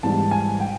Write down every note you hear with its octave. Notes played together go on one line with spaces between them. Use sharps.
G#2 E3 G3 A5
G#5
G5